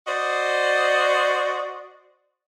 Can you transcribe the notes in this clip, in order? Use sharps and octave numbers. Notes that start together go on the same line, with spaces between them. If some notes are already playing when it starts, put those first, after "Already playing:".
F#4 C5 D5 D#5